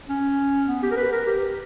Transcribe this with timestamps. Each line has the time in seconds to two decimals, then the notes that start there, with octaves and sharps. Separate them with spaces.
0.09 C#4
0.68 B3
0.83 G4
0.91 A#4
0.97 B4
1.12 A#4
1.26 G4